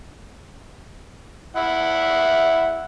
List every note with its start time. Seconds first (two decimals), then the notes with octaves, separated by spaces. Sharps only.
1.56 E4 E5 F#5